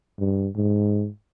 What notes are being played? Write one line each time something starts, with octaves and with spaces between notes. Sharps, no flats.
G2
G#2